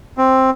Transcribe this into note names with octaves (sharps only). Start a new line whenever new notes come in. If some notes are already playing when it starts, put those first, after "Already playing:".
C4